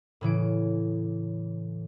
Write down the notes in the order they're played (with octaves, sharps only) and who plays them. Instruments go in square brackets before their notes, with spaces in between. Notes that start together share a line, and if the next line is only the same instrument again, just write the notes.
[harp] A2 C#3 E3 D7